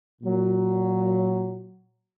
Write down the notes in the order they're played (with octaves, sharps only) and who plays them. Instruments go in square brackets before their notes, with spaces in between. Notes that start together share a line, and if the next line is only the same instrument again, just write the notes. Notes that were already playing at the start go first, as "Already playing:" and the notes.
[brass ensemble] A#2 F#3